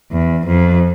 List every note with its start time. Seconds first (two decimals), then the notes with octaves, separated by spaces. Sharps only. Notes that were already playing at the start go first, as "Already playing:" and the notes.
0.12 E2
0.46 F2